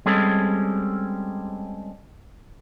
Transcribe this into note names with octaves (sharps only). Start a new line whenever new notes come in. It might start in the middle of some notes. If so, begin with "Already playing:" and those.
G3 G#3 C4 C#4 G#4 A4